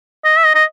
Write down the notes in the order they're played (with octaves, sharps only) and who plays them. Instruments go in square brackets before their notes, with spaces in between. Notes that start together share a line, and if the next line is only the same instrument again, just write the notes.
[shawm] D#5
E5
D#5
D#5